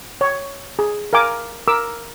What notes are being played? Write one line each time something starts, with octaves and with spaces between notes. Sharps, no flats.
C#5
G#4
A#4 F5 G#5 D6
A#4 D6 E6